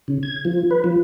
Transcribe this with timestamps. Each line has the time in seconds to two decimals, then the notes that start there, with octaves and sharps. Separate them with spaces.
0.08 C#3
0.23 G#6
0.45 F3
0.71 B4
0.84 F3